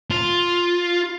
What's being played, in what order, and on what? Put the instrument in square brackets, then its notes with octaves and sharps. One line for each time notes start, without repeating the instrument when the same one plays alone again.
[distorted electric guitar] F4